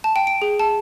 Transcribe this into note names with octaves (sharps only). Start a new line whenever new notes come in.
A5
G5
D7
G#4
A5